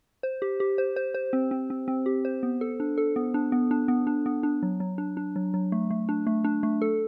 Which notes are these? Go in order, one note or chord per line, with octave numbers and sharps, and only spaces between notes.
C5
G4
G4
C5
C5
C5
C4
C4
C4
C4
G4
C5
B3
A4
D4
A4
B3
D4
B3
D4
B3
D4
B3
D4
F#3
F#3
D4
D4
F#3
F#3
A3
A3
D4
A3
D4
A3
A4